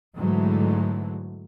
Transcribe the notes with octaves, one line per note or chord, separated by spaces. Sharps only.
G#2 D3 E3 F#3 G#3 A3